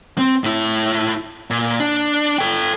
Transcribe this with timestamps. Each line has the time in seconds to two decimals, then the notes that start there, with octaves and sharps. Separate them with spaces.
0.18 C4
0.44 A2 E4
1.50 A#2
1.80 D4
2.38 A4 G5